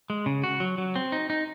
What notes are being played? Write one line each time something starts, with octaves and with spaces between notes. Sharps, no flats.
G#3
C#3
F#4
F#3
F#3
C4
D#4
D#4